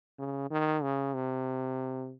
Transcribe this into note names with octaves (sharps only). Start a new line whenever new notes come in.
C#3
D#3
C#3
C3